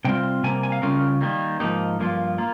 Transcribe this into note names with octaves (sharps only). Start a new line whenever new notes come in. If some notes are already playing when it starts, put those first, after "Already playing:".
C3 G3 C4 F4 G5
C3 G3 A#3 G#5
G#5
F5
C#3 G3 C#4 F4 A#4
D#3 G3 A#3
G#2 F3 A#3 D#4 G4
G2 F3 A#3 F4
A#3 F4